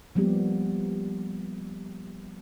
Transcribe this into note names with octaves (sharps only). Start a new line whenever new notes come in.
F3 G3 A#3 B3 G4